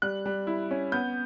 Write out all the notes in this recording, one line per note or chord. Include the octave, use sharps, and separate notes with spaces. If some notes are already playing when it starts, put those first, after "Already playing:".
G3 F#6
G3
E4
C#4
B3 G6